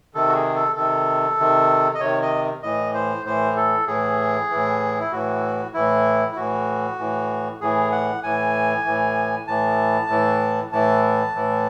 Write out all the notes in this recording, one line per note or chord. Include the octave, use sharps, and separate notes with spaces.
C3 D#3 A4
F#4
G#4
A4
C3 D#3 A4
C3 D#3
D#5
C3 D#3 C#5
D#5
A2 E3 D#5
C5
A2 E3 C5
A4
A2 E3 G#4
E3
A2
E4
A2 E3 F#4
A2 E3 E4
E4
A2 E3 F#4
A2 E3
A2 E3 G#4
F#5
A2 E3 G#5
A2 E3
A2 E3 A5
A2 E3
A2 E3 A5
A2 E3